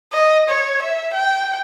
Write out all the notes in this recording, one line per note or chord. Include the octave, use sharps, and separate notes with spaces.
D#5
C#5
E5
G5